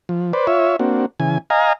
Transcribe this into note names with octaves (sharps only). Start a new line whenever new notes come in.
F3
B4 C5 D5
F4 C#5 E5
A#3 C4 D4 F#4
C#3 E3 G#5
D#5 F5 G#5 A#5